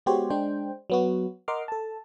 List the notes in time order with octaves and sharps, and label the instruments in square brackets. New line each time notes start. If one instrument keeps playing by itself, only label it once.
[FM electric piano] G#3 B3 F#4 G4 C5 C#5
G#3 D4 C5 G5
F#3 B3 F#4
A#4 D#5 F#5 C6 D6 F6
A4 A5